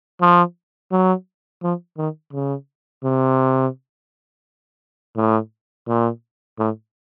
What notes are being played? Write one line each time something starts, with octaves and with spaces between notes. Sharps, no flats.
F3
F#3
F3
D#3
C#3
C3
A2
A#2
A2